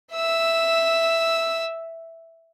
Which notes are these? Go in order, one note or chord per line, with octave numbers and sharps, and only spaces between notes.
E5 E6